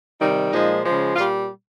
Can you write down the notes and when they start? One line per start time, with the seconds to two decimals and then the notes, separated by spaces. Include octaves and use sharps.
0.19 C3 D#3 G3 D#4
0.51 A#2 F3 G#3 D#4
0.83 C#3 F3 G#3
1.15 A#2 G3 F4